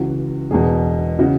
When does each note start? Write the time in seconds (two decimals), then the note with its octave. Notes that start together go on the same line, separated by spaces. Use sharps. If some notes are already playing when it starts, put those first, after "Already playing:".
Already playing: C#2 C#3 E3 F#4
0.51 E1 E2 B2 G#4
1.19 C#3 E3 F#4